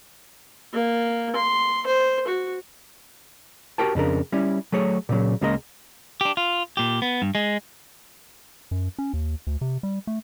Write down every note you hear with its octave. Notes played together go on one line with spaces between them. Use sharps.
A#3
C6
C5
F#4
F#4 G4 A#4 G5 A5
F2 C#3 D4 A#4
G3 C#4 E4
F#3 A3 G#4 C#5
A#2 C#3 F#3
C#2 C#3 G#3 A#3 A#4 D#5
D4 G4
F4
A#2 G4
B3
G2
G#3
F#2
C#4
D#2
D2
C3
G3
A3